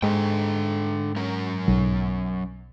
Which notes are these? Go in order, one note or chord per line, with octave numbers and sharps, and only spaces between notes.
G#2 G#3 D4 A4 G5
F#3 C#4 A#4
B1